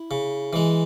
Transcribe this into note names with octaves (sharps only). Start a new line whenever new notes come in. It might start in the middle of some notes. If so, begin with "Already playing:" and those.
Already playing: E4
C#3
E3 G#3